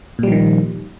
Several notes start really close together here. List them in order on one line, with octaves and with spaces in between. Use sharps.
A#2 G3 F3 D#3